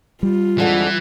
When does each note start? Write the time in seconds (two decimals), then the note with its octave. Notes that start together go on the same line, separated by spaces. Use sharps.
0.23 G3 F4
0.58 F2 D3 E3 G#3